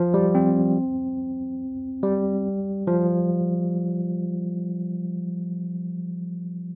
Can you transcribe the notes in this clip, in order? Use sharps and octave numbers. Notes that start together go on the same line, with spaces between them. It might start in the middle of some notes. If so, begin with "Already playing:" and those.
Already playing: F3
G3
C4
G3
F3